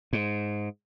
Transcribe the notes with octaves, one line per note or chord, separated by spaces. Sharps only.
G#2